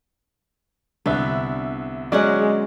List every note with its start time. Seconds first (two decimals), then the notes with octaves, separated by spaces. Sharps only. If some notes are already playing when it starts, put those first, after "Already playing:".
1.06 C2 D3 B3 E5
2.12 F#3 G#3 C#4 D5 F#5